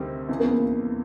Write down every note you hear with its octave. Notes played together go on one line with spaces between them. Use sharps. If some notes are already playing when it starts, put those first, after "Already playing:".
Already playing: D2 C3 D#3 G3 C4
C#2 C#3 E3 C4
B3
A#3